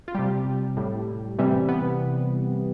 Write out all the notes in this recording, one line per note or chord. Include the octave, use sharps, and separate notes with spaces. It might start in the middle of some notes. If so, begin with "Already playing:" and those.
F4
C3 G3 G4
A2 G3
C3 E3 G3
B3